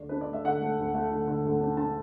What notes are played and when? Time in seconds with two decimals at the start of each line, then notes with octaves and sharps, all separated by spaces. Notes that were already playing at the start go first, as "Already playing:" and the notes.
Already playing: D2 D3 D5
0.09 D4 B4
0.21 D5
0.27 A3
0.33 E5
0.44 D3 F#5
0.61 A3
0.78 D2
0.94 A3
1.11 D3
1.27 D3
1.45 D2
1.61 D4
1.77 D4 A5